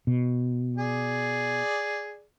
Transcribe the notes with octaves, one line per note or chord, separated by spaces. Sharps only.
B2
G#4 D5